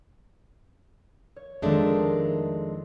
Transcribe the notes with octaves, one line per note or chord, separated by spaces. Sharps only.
C#5
F2 D#3 G#3 A3 D4